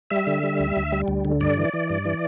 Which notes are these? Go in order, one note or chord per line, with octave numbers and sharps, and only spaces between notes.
G3 E5
D3
G3
D2
D2
G3
D2
D3
G2 D5
E3
E3
G2
E3